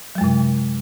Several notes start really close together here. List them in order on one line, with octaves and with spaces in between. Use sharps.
F#3 G#3 F#2 C3